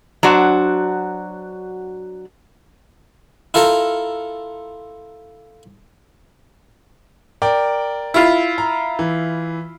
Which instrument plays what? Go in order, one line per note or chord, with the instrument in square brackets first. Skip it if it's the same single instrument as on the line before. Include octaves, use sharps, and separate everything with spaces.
[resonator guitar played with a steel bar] F#3 D4 F#4 C5
[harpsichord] E4 F4 A4 A#4
[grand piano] A#4 D5 G5
[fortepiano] E4 F4
[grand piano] A#5
E3